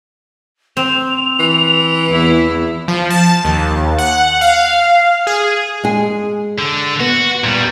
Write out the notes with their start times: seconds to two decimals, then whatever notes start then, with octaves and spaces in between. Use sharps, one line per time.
0.77 C4 F7
1.39 E3
2.10 E2 E4
2.88 F3
3.10 A5
3.44 D#2
3.98 F#5
4.41 F5
5.27 G#4
5.84 G#3 G#4
6.59 D3
7.00 B3 F#4
7.44 A#2 G3